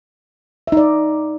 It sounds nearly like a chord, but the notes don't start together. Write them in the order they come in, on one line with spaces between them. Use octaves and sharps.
E5 D#4 D5